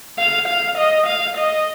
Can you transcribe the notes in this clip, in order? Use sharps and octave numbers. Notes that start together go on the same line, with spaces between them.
F5
F5
D#5
F5
D#5